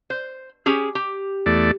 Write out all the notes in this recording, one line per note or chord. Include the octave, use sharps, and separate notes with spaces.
C5
C#4 G4 G#4
G4
E2 A3 D5